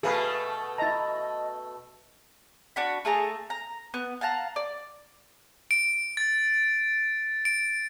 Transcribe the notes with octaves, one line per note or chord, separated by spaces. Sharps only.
B2 A3 G#4 B4 F5
E4 D#5 A5 A#5 A6
D4 F#4 B5
A3 G#4 A4 A#5
A#5
B3 F#6
F5 F#5 A5 A#5
D5
D7
A6
D7